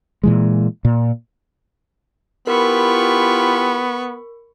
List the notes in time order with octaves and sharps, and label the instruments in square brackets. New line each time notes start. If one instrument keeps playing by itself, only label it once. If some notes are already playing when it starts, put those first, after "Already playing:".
[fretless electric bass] A#2 E3 G#3
A#2
[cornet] B3 [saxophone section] E4 F4 G4 [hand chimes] A#4 [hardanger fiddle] B5 C#6